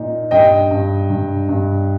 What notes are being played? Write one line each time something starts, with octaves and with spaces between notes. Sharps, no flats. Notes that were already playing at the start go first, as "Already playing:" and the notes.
Already playing: A#2 D#4
G2 D#5 G5
G2
G2
G2